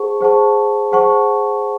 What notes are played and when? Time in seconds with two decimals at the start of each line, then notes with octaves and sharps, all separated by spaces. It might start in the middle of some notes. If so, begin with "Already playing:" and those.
Already playing: G#4 C5 F#5 A5 C#6
0.21 G#4 C5 F#5 A5 C#6
0.92 G#4 C5 F#5 A5 C#6